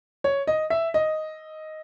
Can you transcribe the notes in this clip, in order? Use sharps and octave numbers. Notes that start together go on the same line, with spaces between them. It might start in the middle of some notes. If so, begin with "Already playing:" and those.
C#5
D#5
E5
D#5